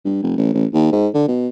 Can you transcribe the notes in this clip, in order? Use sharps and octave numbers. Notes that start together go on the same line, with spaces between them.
G2
F1
A1
A1
D#2
G#2
D3
B2